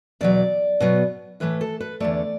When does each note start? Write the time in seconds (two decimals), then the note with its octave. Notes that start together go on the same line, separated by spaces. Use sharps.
0.21 E2 B2 F#3 D5
0.80 B2 F#3 B3
1.40 A2 E3 A3 B4
1.61 A4
1.80 B4
2.00 E2 D3 A3 D5